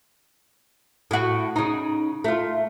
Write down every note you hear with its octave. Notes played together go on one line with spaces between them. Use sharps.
A2 F#4
C#3 D#4
A3 F4